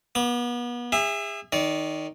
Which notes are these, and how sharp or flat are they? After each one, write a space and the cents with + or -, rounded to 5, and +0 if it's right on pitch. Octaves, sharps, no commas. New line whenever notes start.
B3 -35 D6 +0
G#4 -35 E5 +5
D#3 +0 D5 -30